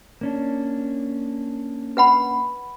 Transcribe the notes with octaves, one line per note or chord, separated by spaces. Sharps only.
A#3 C#4 D4
B4 F#5 B5